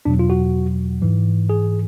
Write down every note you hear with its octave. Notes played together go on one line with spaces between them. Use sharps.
E2 B2 F#3 D4
F4
F#4
G#2 E3
G#4